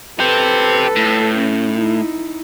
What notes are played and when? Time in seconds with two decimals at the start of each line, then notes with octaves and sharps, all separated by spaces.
0.20 G4 A4 B4 C5
0.96 A2
1.35 C#4
1.69 D#4 E4